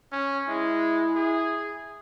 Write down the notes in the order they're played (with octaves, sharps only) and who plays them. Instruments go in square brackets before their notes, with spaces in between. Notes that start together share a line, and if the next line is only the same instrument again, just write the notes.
[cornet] C#4
[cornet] G#3 [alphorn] E4
[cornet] G#4